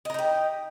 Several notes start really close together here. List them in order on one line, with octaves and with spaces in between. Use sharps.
D#5 A#4 D#4 G4